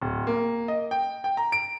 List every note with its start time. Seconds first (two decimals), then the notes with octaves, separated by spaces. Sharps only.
0.01 D1
0.27 A#3
0.68 D#5
0.91 G5
1.24 G5
1.37 A#5
1.52 D7